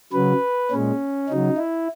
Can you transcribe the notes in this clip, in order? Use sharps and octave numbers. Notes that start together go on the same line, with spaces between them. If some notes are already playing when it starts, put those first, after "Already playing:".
C#3 F#3 B4
A#2 G#3 C#4
C#3 F#3 D#4
E4